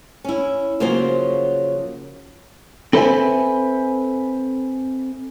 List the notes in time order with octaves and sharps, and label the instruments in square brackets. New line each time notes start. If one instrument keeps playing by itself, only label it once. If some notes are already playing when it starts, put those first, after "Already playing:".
[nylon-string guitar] C#4 E4
C#3 F3 F#3 A#3 F#4 C5
[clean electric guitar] C4 A4 B4 C5 E5 G#5